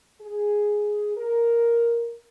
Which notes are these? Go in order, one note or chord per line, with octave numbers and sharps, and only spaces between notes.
G#4
A#4